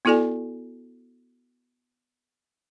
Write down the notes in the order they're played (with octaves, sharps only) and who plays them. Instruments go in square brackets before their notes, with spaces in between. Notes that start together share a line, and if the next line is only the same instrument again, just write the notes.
[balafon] B3 E4 F#4 A4 D5 G#5